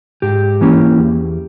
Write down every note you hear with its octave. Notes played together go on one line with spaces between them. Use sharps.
G#2 G4
E3 A#3 C#4
E2